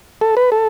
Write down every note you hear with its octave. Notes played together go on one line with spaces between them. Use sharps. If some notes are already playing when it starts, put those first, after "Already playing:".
A4
B4
A4